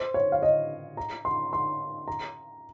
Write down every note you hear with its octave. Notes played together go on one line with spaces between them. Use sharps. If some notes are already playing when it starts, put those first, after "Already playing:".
Already playing: C5
C#5
F5
D#5
A#5
C6
C6
A#5